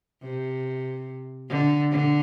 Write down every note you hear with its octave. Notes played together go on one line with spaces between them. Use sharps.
C3
D3
D3